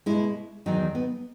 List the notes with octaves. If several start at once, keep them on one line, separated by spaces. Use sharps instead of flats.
B2 G#3 E4
E2 D#3 F#3 D#4
B3